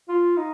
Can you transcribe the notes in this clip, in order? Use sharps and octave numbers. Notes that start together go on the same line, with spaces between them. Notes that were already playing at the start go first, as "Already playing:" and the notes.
F4
D#4